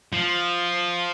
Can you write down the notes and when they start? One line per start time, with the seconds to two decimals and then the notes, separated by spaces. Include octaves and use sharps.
0.13 F3